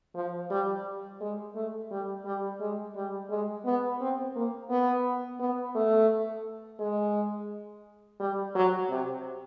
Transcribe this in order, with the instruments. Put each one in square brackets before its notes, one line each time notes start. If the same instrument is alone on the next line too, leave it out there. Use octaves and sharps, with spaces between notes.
[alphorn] F3
G3
G#3
A3
G3
G3
G#3
G3
G#3
B3
C4
A#3
B3
B3
A3
G#3
G3
F#3
C3